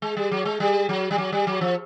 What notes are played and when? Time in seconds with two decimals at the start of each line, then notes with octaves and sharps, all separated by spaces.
0.02 G#3
0.17 G3
0.31 F#3
0.45 G#3
0.60 G3
0.89 F#3
1.11 G3
1.18 F#3
1.32 G3
1.47 F#3
1.61 F3